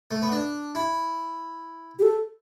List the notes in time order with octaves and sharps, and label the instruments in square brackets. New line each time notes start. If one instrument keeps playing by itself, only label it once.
[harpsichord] A3
B3
D4
E4
[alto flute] G4
A4